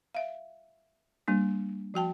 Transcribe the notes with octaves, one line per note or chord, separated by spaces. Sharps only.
E5 F5
G3 A#3 D4
F3 F#4 G5 A5